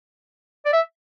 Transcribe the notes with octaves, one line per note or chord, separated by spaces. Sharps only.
D5
E5